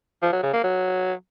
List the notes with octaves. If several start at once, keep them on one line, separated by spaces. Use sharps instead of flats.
F3
F#3
C#3
A#3
F#3